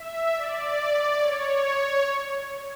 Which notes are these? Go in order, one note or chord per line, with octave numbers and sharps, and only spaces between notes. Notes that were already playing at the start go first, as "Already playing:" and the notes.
Already playing: E5
D5
C#5